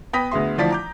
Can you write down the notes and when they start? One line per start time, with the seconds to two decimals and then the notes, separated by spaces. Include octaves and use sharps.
0.13 B3 G5 B5 D#6 A#6 B6
0.31 D2 B3 G#4 E5 C6
0.58 D2 E3 F3 D5 A5 B6
0.71 A#5 D6 G6